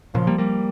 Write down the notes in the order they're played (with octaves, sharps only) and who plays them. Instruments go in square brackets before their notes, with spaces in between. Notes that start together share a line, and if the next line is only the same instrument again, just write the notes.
[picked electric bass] A#2 C#3 [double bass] F3
[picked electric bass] G3 A#3
G3 A#3